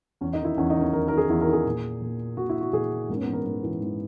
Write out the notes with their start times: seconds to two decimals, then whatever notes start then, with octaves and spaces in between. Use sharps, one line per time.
0.21 E2 C#4
0.33 D#4
0.39 D#3
0.45 E4
0.57 E2 C#4
0.70 D#4
0.76 D#3
0.81 C#4
0.93 E2 A#4
1.08 D#3 A#4
1.17 G#4
1.29 E2 E4
1.41 A#4
1.47 D#3
1.53 G#4
1.66 A#2
2.02 A#2
2.37 A#2 F#4
2.49 E4
2.61 F#4
2.73 A#2 G#4
3.09 G#2 A#3
3.17 C#4
3.21 B3
3.28 E3
3.33 A#4
3.45 G#2 A#4
3.63 E3
3.81 G#2